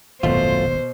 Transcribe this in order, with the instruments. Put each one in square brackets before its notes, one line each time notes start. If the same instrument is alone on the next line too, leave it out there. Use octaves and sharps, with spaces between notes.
[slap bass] D#1 G#1 [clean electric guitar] F#2 A3 F4 [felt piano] B2 B3 [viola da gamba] C5